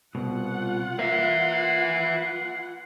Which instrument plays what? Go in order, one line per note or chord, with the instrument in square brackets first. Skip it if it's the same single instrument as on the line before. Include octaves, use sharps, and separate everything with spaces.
[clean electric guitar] C2 B2 [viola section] F4 F#5
[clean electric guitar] A#3 [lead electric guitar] B4 E5 [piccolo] C7